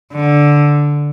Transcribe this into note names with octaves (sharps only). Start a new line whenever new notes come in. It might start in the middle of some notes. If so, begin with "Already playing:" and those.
D3